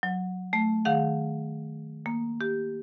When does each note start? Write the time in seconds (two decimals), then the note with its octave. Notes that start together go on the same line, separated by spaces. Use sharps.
0.03 F#3
0.53 A3
0.85 D#3 G#4 F5 F#5
2.06 A#3
2.41 G4